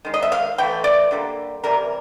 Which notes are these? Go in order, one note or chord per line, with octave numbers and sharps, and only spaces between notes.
D#3 G#3
D#5
E5
F5
E3 A3 G5
D5
D3 G3 A#3
C3 E3 G3 A#4